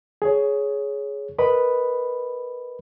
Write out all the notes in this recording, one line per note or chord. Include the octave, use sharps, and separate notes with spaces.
G#4 C#5
A#4 B4 D#5 B5